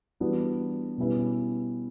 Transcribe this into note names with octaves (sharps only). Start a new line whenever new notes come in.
E3 G3 B3 D4 F#4
B2 G3 C#4 E4 B4